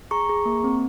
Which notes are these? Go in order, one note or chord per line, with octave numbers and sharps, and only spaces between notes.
G#4 A#5 C#6
G#4
A#3
C4